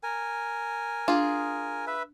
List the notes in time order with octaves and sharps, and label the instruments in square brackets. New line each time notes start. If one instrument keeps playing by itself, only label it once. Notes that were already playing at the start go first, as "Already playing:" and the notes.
[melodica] A#4 G#5
[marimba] D4 [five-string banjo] F4 G#4
[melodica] B4 E5